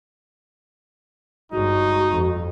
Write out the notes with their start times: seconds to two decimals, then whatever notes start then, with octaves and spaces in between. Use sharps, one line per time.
1.52 G1 G#3 D#4 F#4
2.13 F2